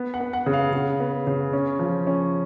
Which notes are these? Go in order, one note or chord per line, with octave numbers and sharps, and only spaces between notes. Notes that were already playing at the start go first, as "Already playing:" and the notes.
Already playing: B3
F#5
B3
F#5
C#3
F5
C#3
B3
C#3
C#4
F3
C#4